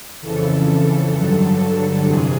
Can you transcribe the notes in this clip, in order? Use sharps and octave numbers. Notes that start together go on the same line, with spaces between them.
F2 C#3 E3 A4
G2 D3 F#3
F2 C3 E3 G#4